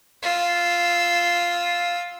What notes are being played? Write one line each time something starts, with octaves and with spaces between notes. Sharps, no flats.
F4 E6